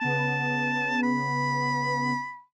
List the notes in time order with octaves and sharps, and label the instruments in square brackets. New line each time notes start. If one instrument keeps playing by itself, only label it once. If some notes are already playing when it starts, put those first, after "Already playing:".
[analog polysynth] C#3 B3 [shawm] A5
[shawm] B5